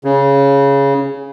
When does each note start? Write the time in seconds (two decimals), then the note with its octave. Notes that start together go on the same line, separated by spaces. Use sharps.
0.04 C#3